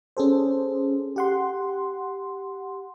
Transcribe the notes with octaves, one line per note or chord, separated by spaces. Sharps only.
C#4 G#4 A4 C5
G4 F#5 C6